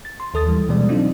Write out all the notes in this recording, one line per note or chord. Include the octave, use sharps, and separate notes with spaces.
A6
C6
D#2 A4 D#6 A6
E3 G3
B2 E3 G3 G#3 D5
F#3 C4 D4 D#4 F4